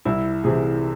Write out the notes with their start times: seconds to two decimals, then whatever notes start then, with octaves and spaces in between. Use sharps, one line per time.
0.05 C2 E4
0.44 C3 E3 G#4